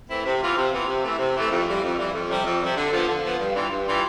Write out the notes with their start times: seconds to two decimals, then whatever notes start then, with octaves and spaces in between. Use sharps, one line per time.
0.09 E3 A3 C4 E4
0.25 C3
0.42 E3 B3 F4
0.57 C3
0.72 E3 B3 F4
0.88 C3
1.04 E3 A3
1.19 C3
1.35 E3 A3
1.51 F2
1.67 E3 G3
1.83 F2
1.98 E3 G3
2.14 F2
2.29 C3 G3
2.45 F2
2.62 C3 G3
2.77 D3
2.92 F3 B3
3.08 D3
3.24 F3 B3
3.39 G2
3.55 E3 G3 D4 F4
3.70 G2
3.86 E3 G3 D4 F4